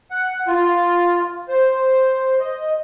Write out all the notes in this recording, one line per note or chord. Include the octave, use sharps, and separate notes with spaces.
F#5
F4
C5
D#5